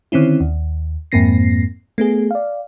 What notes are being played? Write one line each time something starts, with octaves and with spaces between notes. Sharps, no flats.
D3 D#3 C4 C#4 E4
D#2
F2 G#2 A#3 C4 A#6 C7
A3 B3 G#4
D5 F5